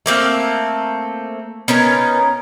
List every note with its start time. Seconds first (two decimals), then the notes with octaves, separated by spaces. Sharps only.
0.06 A3 A#3 C4 F5
1.68 B3 C#4 D#4 A#4